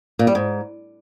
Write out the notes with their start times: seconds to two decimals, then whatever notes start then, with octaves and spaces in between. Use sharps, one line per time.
0.19 A#2
0.27 G3
0.35 G#2